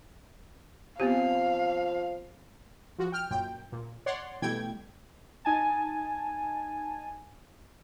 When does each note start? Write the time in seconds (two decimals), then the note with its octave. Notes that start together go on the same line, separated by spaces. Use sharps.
1.00 F3 B3 C4 G4 F5
2.99 F3 F#4
3.12 G5 F6
3.30 F#2 A#2 G5
3.72 A#2
4.06 C#5 D5 F#5 C6
4.42 B2 E3 G3 A3 G5 G#6
5.45 D#4 G#5 A5